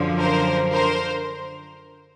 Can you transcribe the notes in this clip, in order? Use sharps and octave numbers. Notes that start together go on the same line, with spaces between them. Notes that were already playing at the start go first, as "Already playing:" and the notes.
Already playing: F#2 D3 F3
A#4 C5
A#4 C5